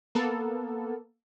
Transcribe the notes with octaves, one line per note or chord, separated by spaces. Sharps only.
A#3 B3 A4